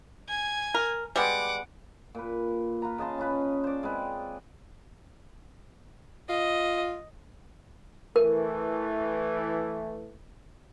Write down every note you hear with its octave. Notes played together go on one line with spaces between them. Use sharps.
G#5 G#6
A#4
G3 G#3 B3 F#5 D6
A#2 B4
F4 B4 A#5
C#3 D#5 A5 C6
C#4 F4 B4 B5
C5 D5
G#3 C4 B4
F4 D#5
E3 A3 A#4